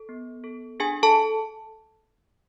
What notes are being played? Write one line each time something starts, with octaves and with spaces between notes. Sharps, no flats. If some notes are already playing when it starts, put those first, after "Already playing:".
Already playing: A4
B3
A4
D4 G#4 G#5
A4 A5